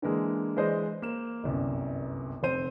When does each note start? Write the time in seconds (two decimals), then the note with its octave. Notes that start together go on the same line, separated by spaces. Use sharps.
0.02 D3 E3 G#3 A#3
0.56 E3 G#3 C5 D5 D#5
1.02 A#3 E7
1.43 G1 C2 F#2
2.43 F1 C4 C5 D#7